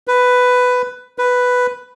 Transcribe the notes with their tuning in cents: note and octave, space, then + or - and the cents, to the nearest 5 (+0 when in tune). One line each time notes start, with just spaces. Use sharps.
B4 +10
B4 +5